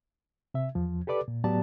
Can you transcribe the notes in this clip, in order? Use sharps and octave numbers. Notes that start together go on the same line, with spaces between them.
C3 E5
E2 F3
G4 A4 B4 D5 D6
A#2
A2 F#3 B3 G4 D5 A5